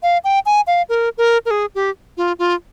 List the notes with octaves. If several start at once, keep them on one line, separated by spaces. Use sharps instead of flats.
F5
G5
G#5
F5
A#4
A#4
A#4
G#4
G4
F4
F4